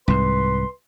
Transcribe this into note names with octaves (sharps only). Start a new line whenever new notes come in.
C2 G#2 B4 C6